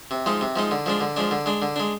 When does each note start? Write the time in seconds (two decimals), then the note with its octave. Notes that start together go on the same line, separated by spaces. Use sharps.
0.11 C3
0.26 F3 G#3 D#4
0.41 C3
0.56 F3 G#3 D#4
0.71 D3
0.86 F3 G#3 D4
1.01 D3
1.16 F3 G#3 D4
1.31 D3
1.46 G#3 D4
1.62 D3
1.76 G#3 D4